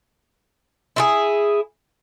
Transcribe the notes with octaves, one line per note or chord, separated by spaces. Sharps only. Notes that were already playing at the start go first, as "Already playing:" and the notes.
E4 F4 G#4